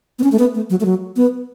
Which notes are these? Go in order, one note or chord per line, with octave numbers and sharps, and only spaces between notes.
B3
C#4
A3
B3
A3
F#3
A3
F#3
B3